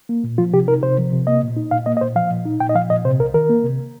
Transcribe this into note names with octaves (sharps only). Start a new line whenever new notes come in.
A#3
A#2
F3 F4
C3 G4
D#4 A#4
C3 C5
F3
C3
A#3 D#5
A#2
D#4
A#2 F5
A#3 D#5
D#5
A#2 C5
F3 F5
A#2
D#4
A#2 G5
D#5
F3 F5
A#2 D#5
C3 C5
C2 A#4
D#3 A#4
A#3
C3